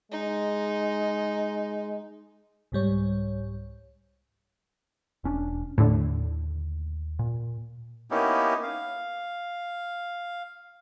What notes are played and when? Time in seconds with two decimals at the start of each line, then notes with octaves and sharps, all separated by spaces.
0.12 G#3 D#4
2.72 C2 G#2 G3 C#5
5.24 E1 C#4 D4
5.78 D#2 A2 D3
7.19 A#2
8.11 A#3 B3 C#4 D#4 E4 G4
8.63 F5